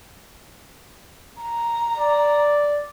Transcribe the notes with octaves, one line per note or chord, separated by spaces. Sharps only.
A#5
D5